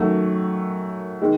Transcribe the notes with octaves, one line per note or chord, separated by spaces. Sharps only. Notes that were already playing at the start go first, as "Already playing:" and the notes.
Already playing: F#2 D#3 F#3 A3
D#3 G#3